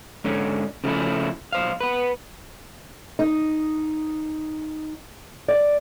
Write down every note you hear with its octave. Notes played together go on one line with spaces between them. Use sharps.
G#2 D3 C#4
C#3 F3 A3 C#4 E4
B1 C5 F5
B3 B4
D#4
D5